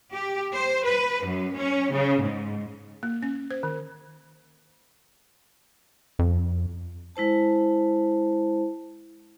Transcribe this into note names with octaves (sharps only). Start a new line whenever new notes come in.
G4
C5
B4
F#2
C#4
C#3
G#2
A#3
C#4
C5
D#3
F2
G#3 E4 C5 A5